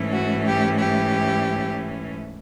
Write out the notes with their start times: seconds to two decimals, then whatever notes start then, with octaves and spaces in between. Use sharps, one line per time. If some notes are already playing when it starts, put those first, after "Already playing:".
Already playing: G#2 E3 A3 C#4
0.11 F#4
0.44 G4
0.79 G4